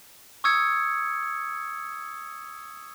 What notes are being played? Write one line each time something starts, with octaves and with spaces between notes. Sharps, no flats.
C#6 D#6 E6 G#6 C#7